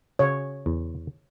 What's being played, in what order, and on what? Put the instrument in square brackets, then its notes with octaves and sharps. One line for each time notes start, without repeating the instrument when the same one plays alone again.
[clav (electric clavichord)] C#3 [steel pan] C#5
[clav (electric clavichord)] E2